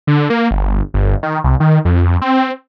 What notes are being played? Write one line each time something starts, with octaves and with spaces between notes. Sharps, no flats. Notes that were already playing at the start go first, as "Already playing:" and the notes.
D3
A#3
G1
G1
D#3
C2
D#3
F2
C4